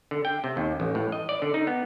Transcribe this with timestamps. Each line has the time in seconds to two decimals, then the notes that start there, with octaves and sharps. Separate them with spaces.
0.11 D3
0.25 G5
0.44 C3
0.57 D#2
0.80 A1
0.95 A2
1.12 D#5
1.29 D5
1.42 D3
1.54 D#4
1.67 B3